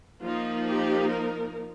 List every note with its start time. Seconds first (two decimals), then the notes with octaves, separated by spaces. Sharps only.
0.21 F3 A#3 D#4 F4
0.66 G4
1.09 A#4